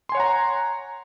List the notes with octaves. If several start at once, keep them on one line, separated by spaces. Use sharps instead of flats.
C#5 F#5 G#5 A#5 C6